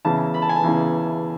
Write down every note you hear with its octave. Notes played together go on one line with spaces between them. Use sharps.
E2 C#3 E3 A5
B5
A5
G#5
A5
E2 C#3 E3